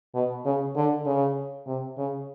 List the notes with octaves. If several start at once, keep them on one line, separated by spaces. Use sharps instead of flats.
B2
C#3
D3
C#3
C3
C#3